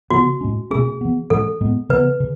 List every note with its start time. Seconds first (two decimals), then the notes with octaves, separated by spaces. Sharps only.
0.10 C#3 E3 B3 F#4
0.41 A2 G#3 C#4
0.71 B2 A3 C#4 G#4
1.01 E3 B3
1.30 A2 E3 G#3 C#4 A4
1.61 A2 G#3 B3
1.89 C#3 E3 B3 B4
2.20 C#3